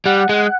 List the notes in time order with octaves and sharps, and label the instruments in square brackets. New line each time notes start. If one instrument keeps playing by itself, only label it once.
[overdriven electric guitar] G3 [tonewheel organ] F#5
[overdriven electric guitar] G#3